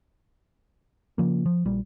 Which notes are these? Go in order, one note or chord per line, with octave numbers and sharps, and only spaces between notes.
C#3 F3 A#3
F3
A#1 A#2 G3